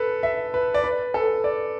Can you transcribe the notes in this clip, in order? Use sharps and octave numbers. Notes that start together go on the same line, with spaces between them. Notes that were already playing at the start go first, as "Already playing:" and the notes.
Already playing: A4 B4
E5
B4
D5
B4
A4
D5